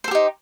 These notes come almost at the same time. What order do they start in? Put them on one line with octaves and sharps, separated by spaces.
C5 A4 G4 D#4